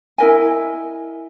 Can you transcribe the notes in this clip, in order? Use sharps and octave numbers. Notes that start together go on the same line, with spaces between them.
E4 A#4 D#5 G#5